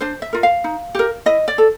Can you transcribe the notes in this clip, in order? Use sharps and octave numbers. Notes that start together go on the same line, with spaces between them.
D4 C5
E5
F4 A#4
F5
D#4
G4 A#4
E4 D#5
D5
A4